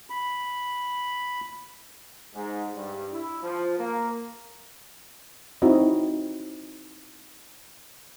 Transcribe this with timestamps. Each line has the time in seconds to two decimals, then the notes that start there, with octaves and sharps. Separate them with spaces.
0.10 B5
2.34 G#2
2.75 G2
3.12 E4
3.43 F3
3.78 A#3
5.62 C4 D#4 E4 F#4 D#5